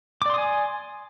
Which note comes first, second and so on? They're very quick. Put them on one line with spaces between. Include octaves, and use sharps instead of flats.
D6 D5 C6 D#6 G#5